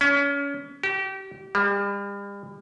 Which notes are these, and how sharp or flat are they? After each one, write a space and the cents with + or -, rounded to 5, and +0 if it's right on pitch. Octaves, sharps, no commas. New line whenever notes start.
C#4 +30
G4 -30
G3 +40